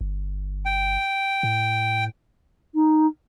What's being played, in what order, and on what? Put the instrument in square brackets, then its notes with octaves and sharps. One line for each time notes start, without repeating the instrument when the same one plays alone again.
[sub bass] G1
[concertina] G5
[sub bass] A2
[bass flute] D#4